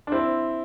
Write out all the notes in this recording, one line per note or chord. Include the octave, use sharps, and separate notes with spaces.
D4
C4 E4